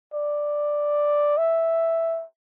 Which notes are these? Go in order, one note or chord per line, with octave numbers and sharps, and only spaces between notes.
D5
E5